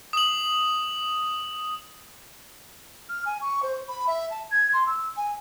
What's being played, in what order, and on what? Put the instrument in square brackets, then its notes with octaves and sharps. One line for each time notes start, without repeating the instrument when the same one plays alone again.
[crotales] D#6 F#7
[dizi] F6
G#5
C#6
C5
B5
E5
A5
G#6
C6
E6
G#5